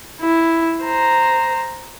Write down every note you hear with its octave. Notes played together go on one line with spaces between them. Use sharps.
E4
C5 A#5